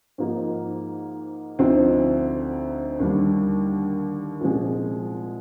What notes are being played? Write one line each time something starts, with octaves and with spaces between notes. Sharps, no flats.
G#2 F3 A#3 D#4
D2 D3 F3 C4 D#4
D#2 D3 G3
C2 A#2 F3 G#3